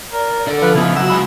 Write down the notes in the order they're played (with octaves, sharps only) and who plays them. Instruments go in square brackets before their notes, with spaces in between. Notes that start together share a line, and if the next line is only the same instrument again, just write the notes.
[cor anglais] A#4 [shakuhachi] D5
[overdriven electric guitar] D3 D5 [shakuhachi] A4
[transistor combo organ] F3 [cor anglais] B4
[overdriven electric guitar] C#3 B3 [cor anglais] E4
[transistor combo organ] F#3 E6 [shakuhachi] F#4
[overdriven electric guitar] C#2 B5 [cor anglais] G#3